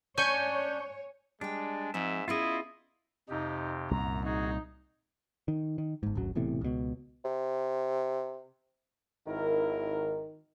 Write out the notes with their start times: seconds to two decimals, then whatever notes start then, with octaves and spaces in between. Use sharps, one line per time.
0.18 C#4 D4 C#5 G#5 C#6 G6
1.41 G3 G#3 D4 G5
1.94 G#2 F3 G#3 C4 E5
2.28 B3 C#4 E4 F4 G#4 D#5
3.29 F2 C3 D#4 G4
3.91 C2 F#2 A#2 A#5
4.25 D#4 F#4 G#4
5.48 D#3
5.78 D#3
6.03 G1 G#2
6.15 D1 G#1 F#2 F#3
6.35 E1 E2 A2 C3
6.61 C#2 B2
7.25 C3
9.27 G#1 D#3 E4 A#4